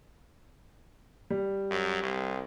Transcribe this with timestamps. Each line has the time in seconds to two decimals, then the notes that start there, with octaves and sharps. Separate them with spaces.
1.30 G3
1.71 F#2
2.03 C2